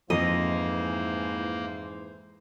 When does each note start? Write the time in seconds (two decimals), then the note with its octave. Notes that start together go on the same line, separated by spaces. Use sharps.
0.10 F2 G#2 E3 A#3 C5 D#5